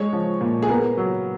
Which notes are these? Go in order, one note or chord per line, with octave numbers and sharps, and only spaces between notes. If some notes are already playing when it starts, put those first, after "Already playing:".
Already playing: G#3 C#5
F3
A#2
G#4
B3 A#4
F#3